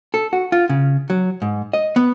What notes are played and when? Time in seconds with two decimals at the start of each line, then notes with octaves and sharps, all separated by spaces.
0.14 A4
0.33 F#4
0.52 F4
0.70 C#3
1.10 F#3
1.42 G#2
1.73 D#5
1.96 B3